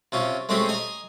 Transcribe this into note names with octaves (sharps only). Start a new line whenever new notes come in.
C3 C#4 F4
G#3 A3 C4 C#4 G4 G#4
D#5 G#5 A#5